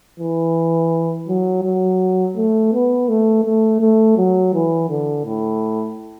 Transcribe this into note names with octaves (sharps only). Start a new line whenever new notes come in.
E3
F#3
F#3
A3
B3
A3
A3
A3
F#3
E3
D3
A2